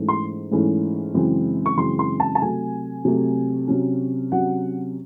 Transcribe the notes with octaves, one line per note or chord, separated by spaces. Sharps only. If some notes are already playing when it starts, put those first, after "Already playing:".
Already playing: G#2 E3 A3 C#4
C6
G#2 E3 A3 C#4
F#2 C#3 E3 G#3 C4
C#6
F#2 C#3 E3 G#3 C4 C6
C6
A5
A5
C3 F#3 A3 G#5
C3 F#3 A3
C3 F#3 C#4
C3 F#3 C#4 F#5